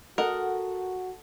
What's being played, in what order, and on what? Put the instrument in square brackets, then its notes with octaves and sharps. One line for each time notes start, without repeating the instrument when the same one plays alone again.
[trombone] F#4 [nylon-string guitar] A4 F#5 [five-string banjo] A#4 D#5